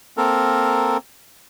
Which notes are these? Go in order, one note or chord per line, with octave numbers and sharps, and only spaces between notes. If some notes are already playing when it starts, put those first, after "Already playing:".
A#3 C4 A4 A#4